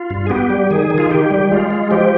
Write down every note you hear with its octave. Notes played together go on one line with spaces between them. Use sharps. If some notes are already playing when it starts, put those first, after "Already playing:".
Already playing: F4
G2
G#4
B3 G4
G3
D#3 G#4
D#3
F4
D#3 G4
G3
G#3 F4
G#3
F3 G4